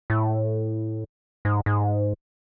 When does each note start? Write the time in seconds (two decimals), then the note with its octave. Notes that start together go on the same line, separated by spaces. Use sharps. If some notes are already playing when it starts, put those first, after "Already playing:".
0.10 A2
1.45 G#2
1.66 G#2